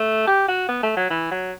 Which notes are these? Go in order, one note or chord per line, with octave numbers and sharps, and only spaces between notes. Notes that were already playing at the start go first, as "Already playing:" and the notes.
Already playing: A3
G4
F#4
B3
A3
F#3
E3
F#3